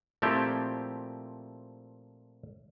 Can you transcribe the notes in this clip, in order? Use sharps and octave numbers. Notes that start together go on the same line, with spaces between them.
A#2 F3 A3 C4 E4 G4